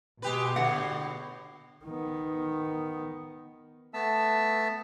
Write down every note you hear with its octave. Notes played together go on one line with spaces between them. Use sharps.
B2 G#3 G4 B4
A2 D3 F#5
D#3 B3
A3 B3 E5 A5 E6